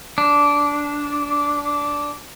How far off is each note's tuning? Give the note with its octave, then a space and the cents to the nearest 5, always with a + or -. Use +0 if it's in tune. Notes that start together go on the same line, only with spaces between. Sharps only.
D4 -15